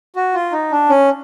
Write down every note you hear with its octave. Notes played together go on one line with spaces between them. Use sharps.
F#4
F4
D#4
D4
C#4